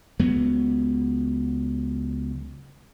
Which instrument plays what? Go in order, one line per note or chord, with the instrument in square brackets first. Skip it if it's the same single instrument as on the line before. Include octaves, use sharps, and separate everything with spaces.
[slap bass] C#2 F#3 B3